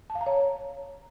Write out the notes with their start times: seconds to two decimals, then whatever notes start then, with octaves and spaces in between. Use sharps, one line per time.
0.10 A5
0.15 F5
0.21 A#5
0.26 C#5